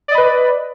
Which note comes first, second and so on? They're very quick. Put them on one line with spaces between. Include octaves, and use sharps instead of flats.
D5 D#5 B5 B4